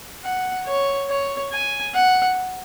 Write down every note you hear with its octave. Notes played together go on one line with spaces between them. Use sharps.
F#5
C#5
C#5
G#5
F#5